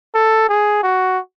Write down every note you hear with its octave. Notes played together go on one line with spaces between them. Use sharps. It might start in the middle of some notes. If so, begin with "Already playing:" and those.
A4
G#4
F#4